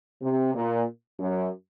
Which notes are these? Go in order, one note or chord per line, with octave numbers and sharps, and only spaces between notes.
C3
A#2
F#2